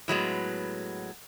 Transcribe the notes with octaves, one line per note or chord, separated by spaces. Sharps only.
A2 F#3 G#3 B3